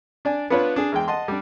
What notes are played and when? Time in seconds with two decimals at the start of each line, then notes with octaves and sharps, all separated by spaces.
0.25 D4 D5 G#5
0.50 B3 D4 F4 B4 C#5
0.76 D4 G#4
0.92 E2 G#3 G5
1.08 D#5 F#5 A5 C6
1.28 G3 D4